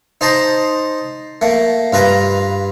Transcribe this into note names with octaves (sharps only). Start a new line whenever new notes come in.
D#4 C5 A5 A#5 C6
A3 A#3
G2 F4 B4 A#5